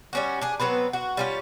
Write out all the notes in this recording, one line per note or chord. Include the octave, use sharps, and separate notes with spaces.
G3 C#4 F#4
D4 G#4
F#3 B3 C4 B4
F#4
G3 C#4 F4